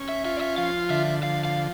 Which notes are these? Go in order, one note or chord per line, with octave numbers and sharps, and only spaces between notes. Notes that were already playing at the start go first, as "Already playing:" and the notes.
Already playing: C#4
E5
F4 E5
D5
E5
F3 F5
D3 E5
F3 F5
F5